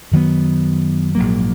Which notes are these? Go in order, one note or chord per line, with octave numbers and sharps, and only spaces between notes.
F#2 D#3 F#3 B3
A#1 G#2 F#3 A#3